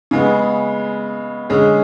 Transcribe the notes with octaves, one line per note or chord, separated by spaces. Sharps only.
C#3 G#3 B3
D3 G#3 C#4 G#4